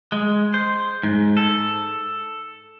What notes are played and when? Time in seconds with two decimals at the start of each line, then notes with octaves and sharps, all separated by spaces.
0.12 G#3
0.54 C5
1.03 G#2
1.37 A4